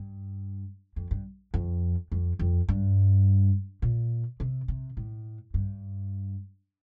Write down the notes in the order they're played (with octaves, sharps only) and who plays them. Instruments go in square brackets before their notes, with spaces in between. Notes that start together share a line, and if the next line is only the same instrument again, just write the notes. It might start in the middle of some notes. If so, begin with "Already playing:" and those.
Already playing: [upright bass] G2
F2
G2
F2
F2
F2
G2
A#2
C3
C3
A2
G2